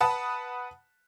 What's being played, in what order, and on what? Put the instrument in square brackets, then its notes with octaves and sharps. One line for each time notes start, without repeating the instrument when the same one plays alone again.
[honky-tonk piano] B4 F#5 A5 D#6